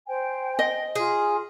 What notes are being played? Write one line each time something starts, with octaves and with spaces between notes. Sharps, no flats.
C5 G5 G#5
D#5
F4 G#4